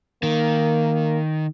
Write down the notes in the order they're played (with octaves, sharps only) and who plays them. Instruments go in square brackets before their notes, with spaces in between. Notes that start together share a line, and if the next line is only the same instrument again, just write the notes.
[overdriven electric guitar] D#3 [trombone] A#3